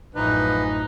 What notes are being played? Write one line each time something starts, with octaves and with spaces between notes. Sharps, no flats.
A1 F#2 E3 F3 D#4 B4